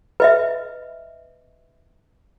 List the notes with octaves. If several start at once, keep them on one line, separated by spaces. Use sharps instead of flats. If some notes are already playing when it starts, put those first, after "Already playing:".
B4 D#5 E5